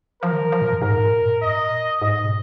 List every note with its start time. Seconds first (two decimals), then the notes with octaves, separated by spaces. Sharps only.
0.22 F3 A#4
0.33 D#3
0.42 F3
0.52 F3
0.62 A#2
0.72 F#2
0.82 G#2 A#4
0.97 A#2
1.11 G#2
1.22 F#2
1.32 G#2
1.42 A#2 D#5
2.01 G#2 D#5
2.24 B2